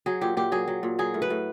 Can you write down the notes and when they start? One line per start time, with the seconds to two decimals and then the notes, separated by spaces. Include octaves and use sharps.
0.06 F#3 G#4
0.21 A#2 G4
0.37 A#2 G4
0.52 F#3 G#4
0.68 F#3
0.83 A#2
0.99 F#3 G#4
1.14 A2
1.22 B4
1.30 A2